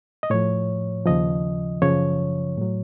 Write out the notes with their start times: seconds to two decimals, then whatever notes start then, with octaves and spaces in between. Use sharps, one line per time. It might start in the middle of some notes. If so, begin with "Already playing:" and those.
0.23 D#5
0.30 A2 F3 C#5
1.06 D#2 C#3 F3 D#5
1.82 F#2 C#3 F3 C#5
2.57 A2 F#3